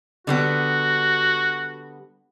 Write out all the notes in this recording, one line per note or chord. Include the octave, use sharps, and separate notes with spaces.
D3 G3 B3 F#4